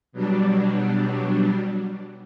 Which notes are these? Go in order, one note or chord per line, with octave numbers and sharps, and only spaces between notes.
B2 F#3 G3 D4